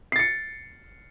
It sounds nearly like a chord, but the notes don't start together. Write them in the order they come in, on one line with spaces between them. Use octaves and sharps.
C7 A6 C#7